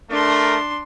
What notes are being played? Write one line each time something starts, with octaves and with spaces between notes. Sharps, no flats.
A3 D4 A#4 C6